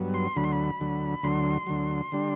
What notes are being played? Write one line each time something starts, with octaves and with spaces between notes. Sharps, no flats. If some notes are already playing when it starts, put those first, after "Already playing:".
Already playing: G2 F#3 B3
C6
D2 D3 F#3 B5
C6
B5
D2 D3 F#3
D2 D3 F#3 C6
D2 D3 F#3
D3 G3 D4